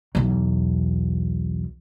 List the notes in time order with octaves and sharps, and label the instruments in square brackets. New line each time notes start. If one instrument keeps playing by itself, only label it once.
[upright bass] B1 E2